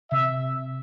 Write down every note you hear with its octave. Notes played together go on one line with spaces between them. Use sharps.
C3 E5